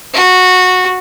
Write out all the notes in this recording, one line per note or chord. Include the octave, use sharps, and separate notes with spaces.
F#4